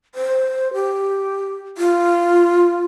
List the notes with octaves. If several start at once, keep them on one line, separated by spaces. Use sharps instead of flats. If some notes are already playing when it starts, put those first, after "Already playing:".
C5
G4
F4